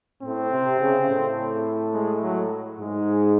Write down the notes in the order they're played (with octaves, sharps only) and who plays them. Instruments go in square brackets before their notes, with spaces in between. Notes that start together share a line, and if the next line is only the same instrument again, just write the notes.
[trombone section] A2 [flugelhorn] C4
[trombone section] C3
C#3
A2
[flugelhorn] G#3
F#3
[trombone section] G#2 [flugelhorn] G#3